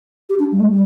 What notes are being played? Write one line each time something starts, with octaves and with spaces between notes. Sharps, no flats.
G4
D4
G3
A3
G3